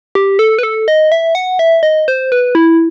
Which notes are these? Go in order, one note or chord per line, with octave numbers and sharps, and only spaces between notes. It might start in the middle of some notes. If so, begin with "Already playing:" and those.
G4
A4
B4
A4
D#5
E5
F#5
E5
D#5
C5
B4
E4